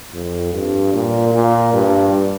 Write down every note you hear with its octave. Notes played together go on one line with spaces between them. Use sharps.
F2
G2
A#2
A#2
G2